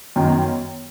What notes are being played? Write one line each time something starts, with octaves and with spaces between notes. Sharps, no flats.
G1 F#2 D#3